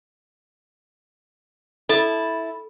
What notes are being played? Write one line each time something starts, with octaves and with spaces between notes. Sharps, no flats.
E4 A4 A5